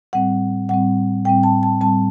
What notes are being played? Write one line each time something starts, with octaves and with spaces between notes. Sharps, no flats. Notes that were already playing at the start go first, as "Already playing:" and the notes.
A2 G3 C4 F#5
A2 G3 C4 F#5
A2 G3 C4 G5
A5
A5
A2 G3 C4 A5